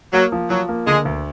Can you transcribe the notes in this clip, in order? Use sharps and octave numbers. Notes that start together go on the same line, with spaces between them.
F#3 A#3
F3
F3 F#3
A#3
D3 G#3
D2